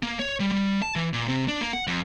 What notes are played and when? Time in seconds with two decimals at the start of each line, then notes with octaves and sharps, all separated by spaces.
0.03 A#3
0.19 C#5
0.40 G3
0.52 G3
0.82 A5
0.96 E3
1.13 A#2
1.28 C3
1.48 D4
1.61 A#3
1.73 F#5
1.87 F2